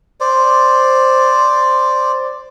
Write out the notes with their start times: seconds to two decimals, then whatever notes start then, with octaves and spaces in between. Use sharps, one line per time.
0.20 C5 D5